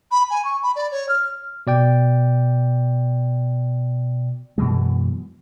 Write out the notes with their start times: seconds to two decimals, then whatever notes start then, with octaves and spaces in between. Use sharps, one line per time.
0.11 B5
0.30 G#5
0.45 C#6
0.63 B5
0.76 D5
0.92 C#5
1.09 F6
1.67 B2 D5 G5
4.58 F#2 B2 E3 G#3